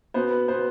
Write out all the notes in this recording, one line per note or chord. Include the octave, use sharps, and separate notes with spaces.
B2 B3 C5
B4
B2 B3 C5